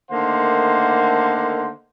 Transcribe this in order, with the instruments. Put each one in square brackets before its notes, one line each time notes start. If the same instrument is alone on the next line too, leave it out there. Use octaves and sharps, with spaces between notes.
[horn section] D3 D#3 A3 A#3 C5 F#5